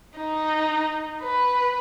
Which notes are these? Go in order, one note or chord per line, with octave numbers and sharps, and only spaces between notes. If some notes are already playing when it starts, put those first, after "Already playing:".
D#4
B4